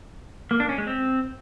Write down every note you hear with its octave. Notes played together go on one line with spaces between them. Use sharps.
A#3
D4
C#4
G#3
C4